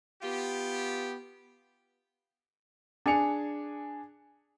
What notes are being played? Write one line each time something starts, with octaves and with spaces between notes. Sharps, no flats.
B3 F4 G4
D4 G#4 G#5 C#7 F7